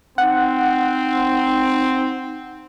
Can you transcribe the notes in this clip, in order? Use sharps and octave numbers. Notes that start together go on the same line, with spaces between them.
C4 D#4 F#5